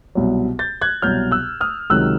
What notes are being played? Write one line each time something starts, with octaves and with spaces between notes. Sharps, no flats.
C2 B2 F#3
G6 A6
F#6 G#6
C2 B2 F#3 F6 G6
E6 F#6
D#6 F6
C#2 C3 D#3 F#3 E6 F#6